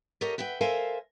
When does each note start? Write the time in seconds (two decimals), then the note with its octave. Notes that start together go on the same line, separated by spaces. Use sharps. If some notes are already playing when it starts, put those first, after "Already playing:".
0.21 G4 A4 A#4 C#5 D#5 F5
0.38 B4 E5 F#5 G5
0.61 A4 A#4 C5 E5 F5 G#5